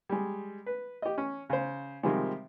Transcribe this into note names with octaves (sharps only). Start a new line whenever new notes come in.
G3 G#3
B4
G4 D#5
C#4
C#3 C5
C3 D#3 F3 G3 G#3